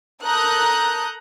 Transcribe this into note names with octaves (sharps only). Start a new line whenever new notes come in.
A4 A#4 A#5 D#6 F#6 G6